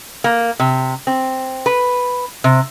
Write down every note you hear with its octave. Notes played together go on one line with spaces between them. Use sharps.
A#3
C3
C4
B4
C3